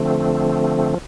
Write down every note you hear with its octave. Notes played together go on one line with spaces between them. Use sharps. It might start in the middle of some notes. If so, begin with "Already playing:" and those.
Already playing: D3 F3 A3 C4